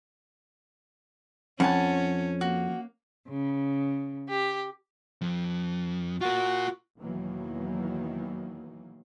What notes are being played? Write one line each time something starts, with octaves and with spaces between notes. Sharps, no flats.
F2 C#4 F#5 G#5 A5
A#3 F#4
C#3
G4
F2
F4 F#4 A#4
E2 B2 D#3 E3 F#3 A#3